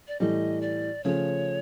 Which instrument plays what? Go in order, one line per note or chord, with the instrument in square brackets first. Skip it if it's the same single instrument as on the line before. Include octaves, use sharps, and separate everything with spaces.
[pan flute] D5
[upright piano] A2 E3 G3 [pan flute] D#5
[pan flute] D5
[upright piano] C#3 F3 A3 [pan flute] C#5